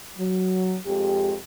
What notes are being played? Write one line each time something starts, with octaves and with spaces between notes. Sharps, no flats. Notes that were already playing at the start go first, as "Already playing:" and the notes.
F#3
F2 G#3 G4